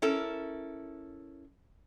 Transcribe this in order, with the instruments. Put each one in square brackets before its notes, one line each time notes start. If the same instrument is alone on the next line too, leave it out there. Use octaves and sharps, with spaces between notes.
[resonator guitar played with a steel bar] C#4 E4 A4 A#4